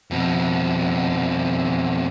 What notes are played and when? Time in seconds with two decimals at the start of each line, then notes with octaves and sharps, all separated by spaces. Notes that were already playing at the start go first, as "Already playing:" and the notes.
0.11 F2 B2